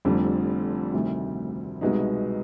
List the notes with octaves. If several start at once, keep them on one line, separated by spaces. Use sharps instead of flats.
F1 F2 D3 G3
D2 C3 D#3 G3
C2 B2 G#3 B3 D#4